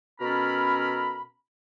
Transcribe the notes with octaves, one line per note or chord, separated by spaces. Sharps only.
B2 C#4 A4 A#4 B5